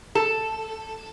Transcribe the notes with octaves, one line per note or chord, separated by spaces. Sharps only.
A4